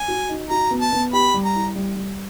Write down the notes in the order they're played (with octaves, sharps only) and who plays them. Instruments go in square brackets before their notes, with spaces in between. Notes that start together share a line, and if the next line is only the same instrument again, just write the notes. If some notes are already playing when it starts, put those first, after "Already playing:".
Already playing: [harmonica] G#5
[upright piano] F#4
D#4
[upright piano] F#4 [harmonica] A#5
[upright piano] B3
[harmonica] A5
[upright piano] B3
[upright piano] G4 [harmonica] B5
[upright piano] G3
[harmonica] A#5
[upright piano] E4
G3
G3